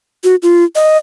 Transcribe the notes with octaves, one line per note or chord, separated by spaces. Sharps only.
F#4
F4
D#5